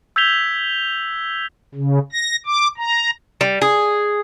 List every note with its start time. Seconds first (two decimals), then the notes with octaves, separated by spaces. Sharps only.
0.16 E6 G6 G#6 B6 F7 G7
1.75 C#3
2.12 A#6
2.46 D6
2.77 A#5
3.41 G3
3.62 G#4